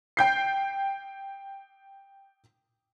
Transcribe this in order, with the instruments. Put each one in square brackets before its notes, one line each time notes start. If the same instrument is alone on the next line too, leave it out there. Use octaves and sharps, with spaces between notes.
[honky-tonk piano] G5 G6 C7